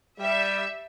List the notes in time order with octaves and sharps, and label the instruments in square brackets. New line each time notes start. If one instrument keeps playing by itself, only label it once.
[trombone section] G3 [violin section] E5